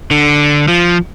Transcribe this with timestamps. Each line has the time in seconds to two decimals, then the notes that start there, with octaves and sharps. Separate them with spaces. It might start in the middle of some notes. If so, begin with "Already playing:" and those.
0.11 D3
0.68 F3